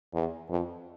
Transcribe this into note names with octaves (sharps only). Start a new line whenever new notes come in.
E2
F2